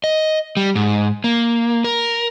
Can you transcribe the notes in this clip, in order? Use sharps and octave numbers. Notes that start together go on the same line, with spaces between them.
D#5
G3
G#2
A#3
A#4